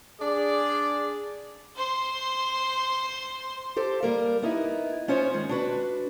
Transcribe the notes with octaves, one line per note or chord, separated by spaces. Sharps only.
D4 G#4 D5
C5 C6
G4 A4 C5
G3 A#3 A#4
B3 D#4 E4
B3 C#4 F4 C5 C#5
D#3 G#3
D4 F#4 B4